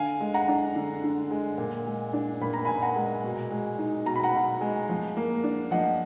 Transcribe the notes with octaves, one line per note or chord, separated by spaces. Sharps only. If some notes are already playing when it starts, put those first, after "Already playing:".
Already playing: D3 F5 G#5
G#3
F#5 A#5
D4
D3
D3
G#3
A#2
G#3
D4
A#2 B5
A#5
A#2 G#5 B5
F#5 A#5
G#3
B2
G#3
D#4
B2 A#5
B5
F#5 A#5
B2
G#3
F3
A#3
D4
F3 D#5 F#5